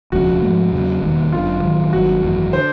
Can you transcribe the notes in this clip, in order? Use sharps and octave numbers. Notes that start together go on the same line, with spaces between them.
E1 D2 C#3 F3 F#4
G#2 F3 A3
E2 C#3 F#3
E1 D#2 D#3 G3
G1 F#2 D3 F4
A1 G2 D#3 F#3
G1 G2 D#3 F#3 F#4
G#1 F#2 C#3 E3
D3 C5